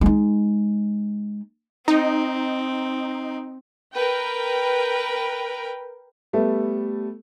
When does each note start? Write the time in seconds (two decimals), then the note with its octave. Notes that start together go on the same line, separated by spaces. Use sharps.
0.01 G#3 D#4
1.88 C4 D#4
3.93 A#4 B4 G5
6.33 G3 A3 B3 A4